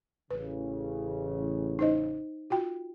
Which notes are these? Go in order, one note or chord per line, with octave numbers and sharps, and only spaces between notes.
A1 C#3 B4
D#4 C5 D#5
F4 F#4 G5